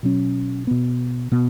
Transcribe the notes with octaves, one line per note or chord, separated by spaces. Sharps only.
B2 F#3 C#4
B2 B3
B2 B3